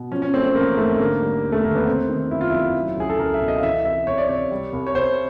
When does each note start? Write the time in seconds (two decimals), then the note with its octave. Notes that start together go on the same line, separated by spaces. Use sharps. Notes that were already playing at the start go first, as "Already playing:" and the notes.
Already playing: B2
0.11 F3 C#4
0.22 C#4
0.34 A3 C4
0.45 C4
0.55 A1 A#3
0.77 G#2 A3
0.99 D3 A#3
1.22 G3
1.43 E1
1.52 A3
1.64 D#2 A#3
1.75 B3
1.87 C3 C4
2.09 D#3
2.31 F#1 E4
2.41 F4
2.50 F2 E4
2.75 F#3
2.97 C#2 G#4
3.10 A4
3.19 C#2 A#4
3.34 E5
3.41 B2
3.48 D#5
3.58 F5
3.63 E3 E5
3.85 C2 E5
4.07 C2 C#5
4.18 D5
4.29 C3 C#5
4.51 G3
4.73 C2
4.87 C#5
4.95 C2 C5